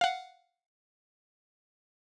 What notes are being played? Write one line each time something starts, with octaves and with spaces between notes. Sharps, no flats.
F5 F#5